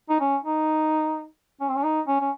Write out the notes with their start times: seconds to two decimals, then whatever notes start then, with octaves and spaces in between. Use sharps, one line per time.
0.09 D#4
0.20 C#4
0.44 D#4
1.61 C#4
1.69 C4
1.76 C#4
1.84 D#4
2.07 C#4
2.21 C#4